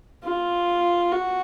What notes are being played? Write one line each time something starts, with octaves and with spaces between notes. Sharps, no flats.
F4
F#4